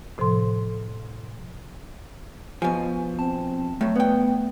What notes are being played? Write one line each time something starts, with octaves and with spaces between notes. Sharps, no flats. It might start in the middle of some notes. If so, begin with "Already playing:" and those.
A2 C3 F3 A4 C6
B2 F3 G#5
C4 A5
A2 F#3 A3
A#2 B3 G5